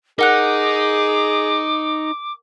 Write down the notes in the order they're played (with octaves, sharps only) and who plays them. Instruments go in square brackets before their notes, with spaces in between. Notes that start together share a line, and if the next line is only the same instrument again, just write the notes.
[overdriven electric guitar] D#4 [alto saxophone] G#4 [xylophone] A#4 F#5 F#6 [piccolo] D6